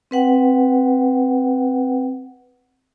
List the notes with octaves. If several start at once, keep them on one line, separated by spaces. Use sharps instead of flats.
C4 B4 F#5 G5